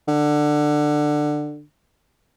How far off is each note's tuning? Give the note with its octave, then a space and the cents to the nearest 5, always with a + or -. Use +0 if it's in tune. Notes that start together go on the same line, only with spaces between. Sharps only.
D3 +20